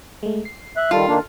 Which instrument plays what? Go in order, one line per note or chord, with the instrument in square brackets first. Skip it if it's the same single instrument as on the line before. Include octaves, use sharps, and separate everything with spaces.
[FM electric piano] G#3 A3
C7
[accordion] E5 F#6
[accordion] D#3 G3 [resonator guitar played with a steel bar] F4 [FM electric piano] A4 A5 F6
[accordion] D#3 A#3 D4